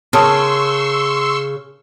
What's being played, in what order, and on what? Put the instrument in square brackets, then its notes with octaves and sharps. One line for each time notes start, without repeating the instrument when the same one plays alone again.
[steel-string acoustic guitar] C#3 [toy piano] A#4 A5 D#6 [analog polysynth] C6 C#6 E6